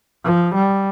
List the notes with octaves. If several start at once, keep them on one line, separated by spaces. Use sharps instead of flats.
F3
G3